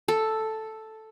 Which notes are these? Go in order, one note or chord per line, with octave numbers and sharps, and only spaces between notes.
A4